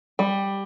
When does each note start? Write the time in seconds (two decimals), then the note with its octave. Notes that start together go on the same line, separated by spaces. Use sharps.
0.19 G3